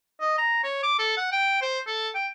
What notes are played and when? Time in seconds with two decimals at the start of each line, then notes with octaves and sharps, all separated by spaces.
0.21 D#5
0.38 A#5
0.64 C#5
0.83 D6
0.99 A4
1.17 F#5
1.32 G5
1.62 C5
1.87 A4
2.15 G5